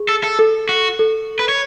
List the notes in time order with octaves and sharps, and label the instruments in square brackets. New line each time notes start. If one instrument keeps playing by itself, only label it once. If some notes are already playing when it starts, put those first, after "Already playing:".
Already playing: [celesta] G#4
[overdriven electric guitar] A4
A4
[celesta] A4
[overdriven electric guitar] F#4
[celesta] A4
[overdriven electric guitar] B4
C#5